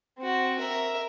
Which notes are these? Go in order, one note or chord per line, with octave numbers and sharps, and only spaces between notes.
C4 F#4
A#4 E5